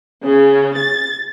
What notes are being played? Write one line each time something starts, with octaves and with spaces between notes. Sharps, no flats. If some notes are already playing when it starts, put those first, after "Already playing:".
C#3
A6